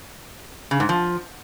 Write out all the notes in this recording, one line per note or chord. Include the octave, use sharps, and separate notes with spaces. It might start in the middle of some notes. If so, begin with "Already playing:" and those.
C#3
G#2
F3